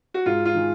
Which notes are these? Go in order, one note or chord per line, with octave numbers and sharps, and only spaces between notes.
F#4
G#2 F4
F4
D#3 G#3